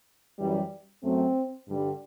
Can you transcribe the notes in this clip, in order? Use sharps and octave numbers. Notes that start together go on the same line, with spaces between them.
F#2 E3 G3
F#2 F#3 A3 C4
G2 D3 G3